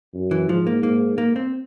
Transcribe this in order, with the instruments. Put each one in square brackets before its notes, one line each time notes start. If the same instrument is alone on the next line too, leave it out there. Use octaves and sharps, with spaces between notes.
[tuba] F#2
[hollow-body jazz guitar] E3
[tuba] G#2 [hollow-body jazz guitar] F3
[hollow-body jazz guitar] A#3
[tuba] G#2 [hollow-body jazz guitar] A#3
[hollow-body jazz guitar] A#3
C4